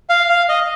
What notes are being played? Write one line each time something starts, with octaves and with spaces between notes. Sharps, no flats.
F5
F5
D#5